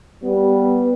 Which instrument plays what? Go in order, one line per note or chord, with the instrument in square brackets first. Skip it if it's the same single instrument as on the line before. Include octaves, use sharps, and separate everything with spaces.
[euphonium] G3 [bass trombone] B3